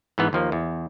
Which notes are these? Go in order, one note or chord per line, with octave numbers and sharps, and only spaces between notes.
G#2 E3 B3
D#2 F3 A#3
E2